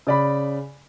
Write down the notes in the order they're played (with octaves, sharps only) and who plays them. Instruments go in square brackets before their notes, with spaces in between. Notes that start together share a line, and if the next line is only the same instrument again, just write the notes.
[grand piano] C#3 D5 B5